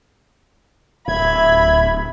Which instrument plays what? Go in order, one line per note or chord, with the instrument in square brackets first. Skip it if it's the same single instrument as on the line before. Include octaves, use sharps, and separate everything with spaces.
[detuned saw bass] D1 [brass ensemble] E5 [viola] B5 [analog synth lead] G#6